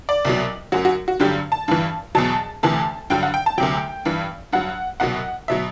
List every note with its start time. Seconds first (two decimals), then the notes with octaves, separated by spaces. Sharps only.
0.09 D5
0.25 C2 B2 F#3
0.72 F#2 F#3 F#4
0.85 F#4
1.08 F#4
1.20 G2 D3 F#3 G4
1.52 A5
1.68 G2 E3
2.15 E2 B2 F#3 A5
2.63 D2 C3 E3 A5
3.10 G2 D3 F#3 G5
3.23 F#5
3.34 G5
3.46 A5
3.58 D2 C3 F#3 G5
4.05 G2 E3
4.53 G2 F#3 F#5
5.00 C2 B2 F#3 F#5
5.48 B2 F#3 E5